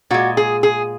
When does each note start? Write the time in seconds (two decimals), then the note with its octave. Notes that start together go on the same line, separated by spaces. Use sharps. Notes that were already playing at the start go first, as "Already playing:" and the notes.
0.10 A#2 G#3 F#4
0.37 G#4
0.63 G#4